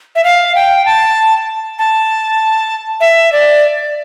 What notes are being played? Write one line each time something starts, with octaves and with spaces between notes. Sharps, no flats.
E5
F5
G5
A5
A5
E5
D5